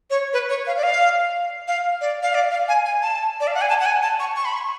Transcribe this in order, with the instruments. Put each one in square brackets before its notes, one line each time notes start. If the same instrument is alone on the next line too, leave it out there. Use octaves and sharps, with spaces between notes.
[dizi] C#5
B4
C#5
F5
D5
F5
F5
D5
F5
D5
F5
G#5
G#5
A5
D5
F5
F#5
G#5
A5
F#5
G#5
A5
C#6
C#6
B5
C#6